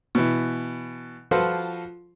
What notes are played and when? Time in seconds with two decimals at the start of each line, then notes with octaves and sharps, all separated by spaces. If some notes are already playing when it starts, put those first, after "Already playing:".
0.15 B2 E3
1.31 F3 F4 F#4 A4 B4 C5